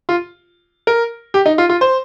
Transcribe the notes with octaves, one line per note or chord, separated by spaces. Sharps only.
F4
A#4
G4
D#4
F4
F4
C5